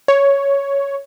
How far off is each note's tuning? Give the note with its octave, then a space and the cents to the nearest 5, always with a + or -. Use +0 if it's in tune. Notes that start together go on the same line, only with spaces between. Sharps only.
C#5 +5